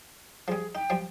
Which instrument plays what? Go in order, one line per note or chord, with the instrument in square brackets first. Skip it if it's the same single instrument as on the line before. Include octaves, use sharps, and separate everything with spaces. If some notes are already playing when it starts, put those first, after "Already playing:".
[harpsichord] F3 G3 [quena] G#4
[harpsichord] D#4 [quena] G5
[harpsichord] F3 G3 G#3